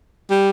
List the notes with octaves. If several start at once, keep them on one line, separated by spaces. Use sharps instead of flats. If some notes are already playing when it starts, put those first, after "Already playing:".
G3